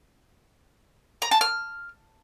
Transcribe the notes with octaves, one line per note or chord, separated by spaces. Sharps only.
A#5
A5
F6